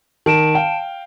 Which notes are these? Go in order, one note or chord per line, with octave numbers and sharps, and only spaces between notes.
D#3 A5 D7 E7
F5 G5